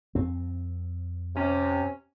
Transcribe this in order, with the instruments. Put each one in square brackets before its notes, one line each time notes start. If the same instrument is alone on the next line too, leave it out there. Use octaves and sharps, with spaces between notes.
[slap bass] F2 C4
[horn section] C3 C#4